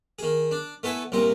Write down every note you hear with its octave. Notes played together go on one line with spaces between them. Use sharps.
D#3 G#4
D4
A3 B3 E4 G#5
C2 A#2 C4 A#4